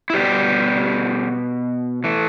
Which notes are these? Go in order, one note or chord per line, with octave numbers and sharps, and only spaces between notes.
E4
B2 G3 B3 G4
E3 A3